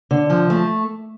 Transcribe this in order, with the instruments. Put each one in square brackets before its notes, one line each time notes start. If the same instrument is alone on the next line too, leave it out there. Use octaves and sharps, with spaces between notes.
[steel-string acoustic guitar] D3
F3
A3